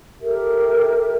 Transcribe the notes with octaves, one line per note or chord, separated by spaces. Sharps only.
G4 A4 A#4 E5